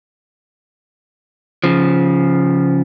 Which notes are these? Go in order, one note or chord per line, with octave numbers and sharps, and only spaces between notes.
C#3 F3